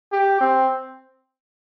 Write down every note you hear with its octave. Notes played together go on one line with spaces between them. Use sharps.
G4
C4